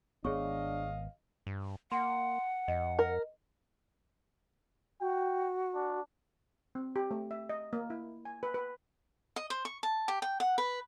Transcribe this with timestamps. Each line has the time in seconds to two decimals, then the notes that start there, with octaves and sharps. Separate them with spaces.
0.25 G#1 B3 D4 G#4 C#5 D#5 F5 C#6
1.47 G2
1.92 A#3 F#5 C6
2.68 F2 D#5
2.99 A#4
5.01 F#4 G5
5.75 D4
6.75 C4
6.96 G4
7.11 A3
7.31 E5
7.49 D#5
7.73 A#3
7.90 E4
8.25 G#5
8.43 B4
8.54 B4
9.36 D#5
9.50 C5
9.65 C#6
9.83 A5
10.08 G4
10.22 G5
10.40 F#5
10.58 B4